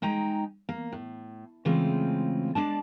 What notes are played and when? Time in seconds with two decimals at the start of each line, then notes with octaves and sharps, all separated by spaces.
0.02 G#3 D#4 G5 G#5 A#5
0.69 A#3
0.92 A2
1.65 C#3 E3 G#3 A3 C4 F4
2.55 G#3 D4 D5 A5